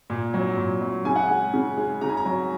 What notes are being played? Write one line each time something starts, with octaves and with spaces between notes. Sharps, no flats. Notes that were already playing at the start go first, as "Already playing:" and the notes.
A#2
F#3
A#2
F#3
C#3 G#5
F#5
G#3 G#5
C#3
G#3
C#3 A#5
G#5
A#5
F#3